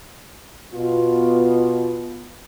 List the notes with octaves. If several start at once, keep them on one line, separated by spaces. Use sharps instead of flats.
B2 B3 F4